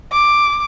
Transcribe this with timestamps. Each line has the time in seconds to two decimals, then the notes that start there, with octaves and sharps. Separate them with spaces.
0.12 D6